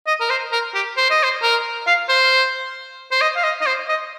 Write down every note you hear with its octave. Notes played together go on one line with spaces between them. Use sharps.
D#5
A#4
C5
A#4
G4
C5
D#5
C5
A#4
F5
C5
C5
D#5
F5
D#5
D#5
C5
D#5